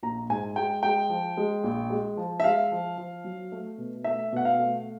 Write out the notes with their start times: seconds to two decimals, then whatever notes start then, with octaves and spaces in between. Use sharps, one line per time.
0.03 A#1 A#5
0.30 G#2 G#5
0.56 G#3 G5
0.83 G#3 G5
1.10 F3
1.37 G#3
1.64 A#1
1.90 G#3
2.17 F3
2.40 E5
2.44 G#3 F5
2.72 F3
2.98 F3
3.24 F#3
3.52 A3
3.78 B2
4.04 A3 E5
4.32 B2 F#5
4.45 F5
4.58 A3